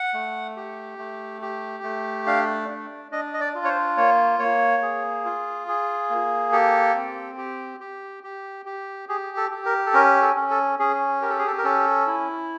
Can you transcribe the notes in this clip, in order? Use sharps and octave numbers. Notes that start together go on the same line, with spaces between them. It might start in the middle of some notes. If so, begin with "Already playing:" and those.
Already playing: F#5
A3
G4
A3
G4
A3
D4 F5
D4
D4 D#5
D#5
D5
F4
C#5
C5
A#3 C#5
A#3 C#5
G#4
F4
G#4
A#3
G4 A4
C4
G4
G4
G4
G4
G4 G#4
A4
G4
A#4
A4
C#4 A#4
A4
C#4
A4
C#4 G#4
G4 A#4
A4
G#4
A4
A#4
C#4 A4
E4